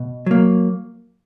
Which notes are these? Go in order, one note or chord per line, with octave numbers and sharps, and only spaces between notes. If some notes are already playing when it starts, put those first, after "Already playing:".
Already playing: B2
F#3 A#3